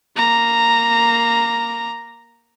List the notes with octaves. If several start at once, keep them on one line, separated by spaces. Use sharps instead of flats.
A#3 A#5